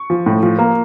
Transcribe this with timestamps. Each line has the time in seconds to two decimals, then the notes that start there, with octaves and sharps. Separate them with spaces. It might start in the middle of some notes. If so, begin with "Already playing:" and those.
Already playing: C#6
0.10 F3
0.26 A2
0.43 F3
0.59 A#3